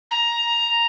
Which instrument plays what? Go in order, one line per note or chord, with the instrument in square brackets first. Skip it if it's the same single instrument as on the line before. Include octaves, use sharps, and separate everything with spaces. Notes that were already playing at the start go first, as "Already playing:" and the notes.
[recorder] A#5